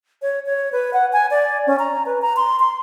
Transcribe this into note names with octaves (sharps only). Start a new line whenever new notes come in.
C#5
C#5
B4
F#5
G#5
D5
C#4
A#5
B4
A#5
C6
C6